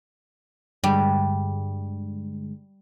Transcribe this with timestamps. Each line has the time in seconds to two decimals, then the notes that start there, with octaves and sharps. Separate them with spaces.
0.84 G2 D3 G3 G#3